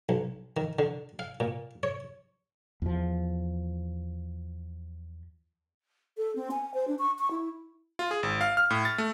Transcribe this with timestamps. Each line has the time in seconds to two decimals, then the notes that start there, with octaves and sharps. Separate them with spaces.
0.09 B1
0.57 D#3
0.79 D3
1.19 F5
1.40 A#2
1.83 C#5
2.82 E2 F3
6.17 A4
6.36 C4
6.51 G#5
6.74 C5
6.88 D4
6.99 C#6
7.19 C#6
7.31 E4
7.99 F4
8.11 G#4
8.23 G#1
8.41 F5
8.57 F6
8.70 A2
8.85 A6
8.98 A3